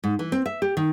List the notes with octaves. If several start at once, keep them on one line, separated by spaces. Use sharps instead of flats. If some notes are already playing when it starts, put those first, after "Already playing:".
G#2
E3
C4
E5
G4
D#3